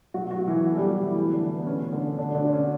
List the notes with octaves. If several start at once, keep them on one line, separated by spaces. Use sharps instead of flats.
B2 F#3 F#4
F#3 F#4
B2
E3 E4
B2
A4
G3 G4
B2 F#3 F#4
E3 E4
E3 E4
D3 D4
E3
B3
B3
B2 C#4
B2 D3 D4
B2 D3 D4
D3 D4
B2
C#4